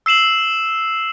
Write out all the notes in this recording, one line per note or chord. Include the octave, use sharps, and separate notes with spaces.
E6 C7 E7 F#7